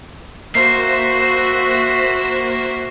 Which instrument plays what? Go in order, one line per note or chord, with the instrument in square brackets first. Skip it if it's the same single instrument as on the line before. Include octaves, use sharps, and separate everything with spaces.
[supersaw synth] A#3 C5 C6 [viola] F#4 [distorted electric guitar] E5 [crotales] C7